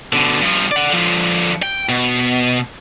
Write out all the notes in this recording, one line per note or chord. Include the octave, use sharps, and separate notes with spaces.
B2 D3
G2 F3
D5 F#5
D3 F3
G5
B2